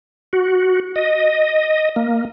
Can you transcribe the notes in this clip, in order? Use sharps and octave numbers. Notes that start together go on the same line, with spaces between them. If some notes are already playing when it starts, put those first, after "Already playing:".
F#4
D#5
A#3